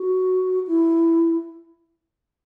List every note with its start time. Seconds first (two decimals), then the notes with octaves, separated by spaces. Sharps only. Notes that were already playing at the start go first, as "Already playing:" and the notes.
Already playing: F#4
0.67 E4